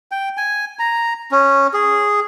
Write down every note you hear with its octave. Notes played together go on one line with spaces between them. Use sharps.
G5
G#5
A#5
C#4
G#4